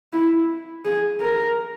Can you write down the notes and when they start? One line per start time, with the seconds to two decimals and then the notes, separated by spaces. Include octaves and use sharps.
0.13 E4
0.85 G#4
1.20 A#4